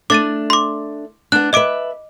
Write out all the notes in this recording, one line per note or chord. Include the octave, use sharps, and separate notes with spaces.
A3 D4 D6 A6 D#7
C6 D6
B3 D4 F#6
B4 D#5 E5 D6 D7